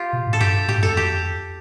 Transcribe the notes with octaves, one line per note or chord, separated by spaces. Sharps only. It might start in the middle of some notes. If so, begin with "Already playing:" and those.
Already playing: F4 G4
B2
A2
A4
G2 G4
A2 G4
G2
F2 A4
G4